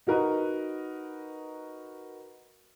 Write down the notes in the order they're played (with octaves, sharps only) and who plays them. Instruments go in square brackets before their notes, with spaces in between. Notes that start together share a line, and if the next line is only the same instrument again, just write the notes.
[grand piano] D#4 F#4 A#4 B4 D#5